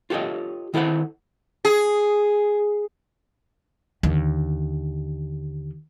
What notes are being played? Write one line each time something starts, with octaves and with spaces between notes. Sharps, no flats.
F4 G4 A4 C#5 D#5
D#3 E4 A4 C5 F#5
G#4
D#2 D3